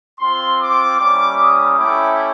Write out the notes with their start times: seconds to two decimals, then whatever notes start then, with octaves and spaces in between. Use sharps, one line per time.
0.19 C4 F4 C6
0.59 D6
0.98 G3 A#3 C#4 E4 D6
1.38 D#6
1.77 A3 C#4 E4 G4 D6